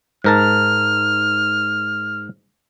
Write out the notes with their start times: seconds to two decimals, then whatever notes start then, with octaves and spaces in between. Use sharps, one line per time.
0.24 G#2 A#4 A5 F6